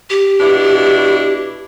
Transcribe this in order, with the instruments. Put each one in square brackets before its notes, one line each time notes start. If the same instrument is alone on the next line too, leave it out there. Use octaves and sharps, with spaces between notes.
[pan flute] G4
[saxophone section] B2 D4 E4